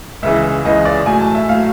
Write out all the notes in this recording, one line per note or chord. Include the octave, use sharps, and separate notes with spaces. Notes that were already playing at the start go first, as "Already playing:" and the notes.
C#2 C#3 E3 E5
C#2 C#3 E3 D#5
D5
A2 F#3 G#5
A5
E5
A2 F#3 F5